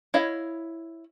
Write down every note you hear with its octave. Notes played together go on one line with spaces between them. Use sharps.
E4 C#5 D#5 F5